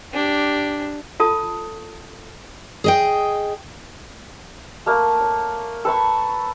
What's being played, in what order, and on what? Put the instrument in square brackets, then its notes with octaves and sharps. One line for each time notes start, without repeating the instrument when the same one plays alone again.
[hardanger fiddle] D4 G4
[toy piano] F4 A4 A5 D#6
[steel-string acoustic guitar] G#4 D#5 G5
[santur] A3 A#3
C#5
A4 B4 B5 C#6